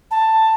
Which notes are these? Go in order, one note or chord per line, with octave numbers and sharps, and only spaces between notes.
A5